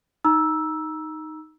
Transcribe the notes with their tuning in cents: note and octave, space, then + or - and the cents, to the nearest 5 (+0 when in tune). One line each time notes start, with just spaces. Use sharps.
D#4 +0 A#5 +25 E6 +0